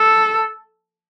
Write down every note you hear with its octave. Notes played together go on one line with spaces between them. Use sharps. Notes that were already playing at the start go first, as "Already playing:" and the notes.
Already playing: A4